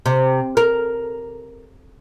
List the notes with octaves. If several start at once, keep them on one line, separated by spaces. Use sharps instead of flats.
C3
A#4